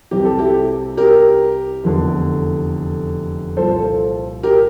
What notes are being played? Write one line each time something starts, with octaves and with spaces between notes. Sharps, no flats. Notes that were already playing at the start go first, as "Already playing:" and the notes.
C2 C3 E3 G4
A4
E4 G4
G4 A#4
F1 E2 D3
C2 A#2 F3 A4 C5
G4 A#4